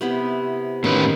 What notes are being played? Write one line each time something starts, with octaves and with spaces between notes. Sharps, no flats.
C3 B3 E4
A2 D#3 C4 C#4 B4